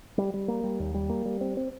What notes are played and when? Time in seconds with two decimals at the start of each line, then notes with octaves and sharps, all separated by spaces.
0.18 G3
0.34 G3
0.48 A#3
0.64 G3
0.79 D#2
0.94 G3
1.09 A#3
1.25 G3
1.41 C4
1.57 C4